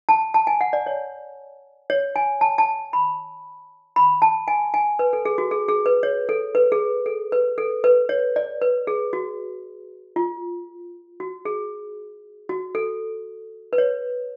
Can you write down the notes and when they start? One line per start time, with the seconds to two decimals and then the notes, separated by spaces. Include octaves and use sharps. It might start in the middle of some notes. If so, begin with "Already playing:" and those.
0.09 A5
0.34 A5
0.47 G#5
0.61 F#5
0.73 D5
0.87 C#5
1.90 C#5
2.16 G#5
2.41 A5
2.58 A5
2.93 B5
3.96 B5
4.22 A5
4.48 G#5
4.74 G#5
4.99 B4
5.13 A4
5.25 G#4
5.38 F#4
5.51 G#4
5.69 G#4
5.86 B4
6.03 C#5
6.29 A4
6.55 B4
6.72 G#4
7.06 A4
7.32 B4
7.58 A4
7.84 B4
8.09 C#5
8.36 D5
8.62 B4
8.87 G#4
9.13 F#4
10.16 F4
11.20 F#4
11.45 G#4
12.49 F#4
12.75 A4
13.73 B4
13.78 C#5